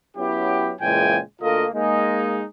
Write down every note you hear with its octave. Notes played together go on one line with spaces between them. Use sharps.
F#3 B3 C#4 E4 G4
A#2 C#3 E3 G#3 G5 G#5
D2 A#3 F4 A4 A#4 D#5
G#3 A#3 D#4